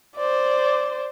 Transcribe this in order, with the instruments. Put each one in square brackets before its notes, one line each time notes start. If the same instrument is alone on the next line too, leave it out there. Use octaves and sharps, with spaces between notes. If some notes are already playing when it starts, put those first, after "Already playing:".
[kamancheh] C5 D5